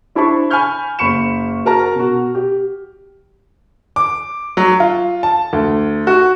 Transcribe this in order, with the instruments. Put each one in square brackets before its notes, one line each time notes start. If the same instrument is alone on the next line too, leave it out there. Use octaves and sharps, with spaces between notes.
[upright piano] D4 E4 C5 A5 B5 C#6
G#5 B5 C#6 F6 G6
F#1 B5 C#6 C#7 E7
F#4 A#4 A5 A#5 F6
B2 F#4
G4
D6
F#3
F4
A5
D2
F#4